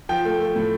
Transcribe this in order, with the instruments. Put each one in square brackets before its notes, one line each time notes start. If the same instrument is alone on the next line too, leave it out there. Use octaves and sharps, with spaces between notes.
[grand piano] F3 G5
A3
A3
A2